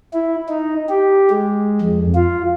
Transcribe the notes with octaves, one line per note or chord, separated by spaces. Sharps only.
E4
D#4
G4
G#3
F2
F4